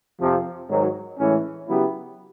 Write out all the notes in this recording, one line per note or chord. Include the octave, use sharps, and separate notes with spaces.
F2 C3 F3
G#2 D#3 F#3
A2 E3 G#3 C#4
C#3 F#3 B3 E4 G4